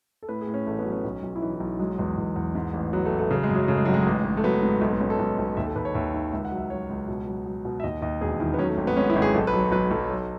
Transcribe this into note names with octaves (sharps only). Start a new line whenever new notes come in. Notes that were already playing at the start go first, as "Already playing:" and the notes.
A4
A2 B4
G#4
A2
C#4
A1 A3
B3
F#3
C#4
B1
B1
E4
E3 D#4
E4
B1
F#3 G#3
E2 G#3
E2
E2
G#2
A1
F#3 B3
A3
A1
A3
C#3 F#3
G#3
F#2
F#3
C#3 A3
G#3
G#1 F#3
G#3
A1
A1
A3
F#3 B3
G#2
B1 A3
B3
B1 C#4
A4
B1
B1
D#2 E5
A4
D#2 B4
C#5
D#2 E5
D#3 E5
C#2 E5
F#5
F#3
E5
F#3 C#5
C#2
B2
F#3
F#3
B2
E5
D#2 D#5
D#2 D#5
E1 G#4
D#3 E4
B3
F#3 C#4
A3
G#1
B3
G#2 C#4
E4
G#1
G#4
B1 A4
B4
F#3
C#5
B1 B4
B1 A4
F#3